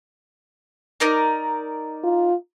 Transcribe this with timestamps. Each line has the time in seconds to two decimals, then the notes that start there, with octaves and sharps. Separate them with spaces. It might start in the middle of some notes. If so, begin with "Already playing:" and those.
1.00 D#4 A#4 D5
2.04 F4